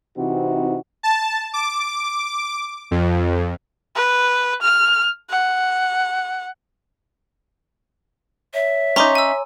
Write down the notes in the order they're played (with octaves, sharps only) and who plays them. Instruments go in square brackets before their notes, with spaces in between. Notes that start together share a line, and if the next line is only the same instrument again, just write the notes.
[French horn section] C3 E3 C4 D#4 E4 F#4
[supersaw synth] A5
D6
F2
[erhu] B4
F6
F#5
[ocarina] C#5 [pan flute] E5
[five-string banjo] C#4 D#4 [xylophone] A#5 C6 D6
[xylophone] G#5 E6